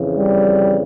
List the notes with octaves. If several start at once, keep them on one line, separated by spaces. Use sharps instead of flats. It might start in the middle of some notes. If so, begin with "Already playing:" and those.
Already playing: F2 C#3 E3
G3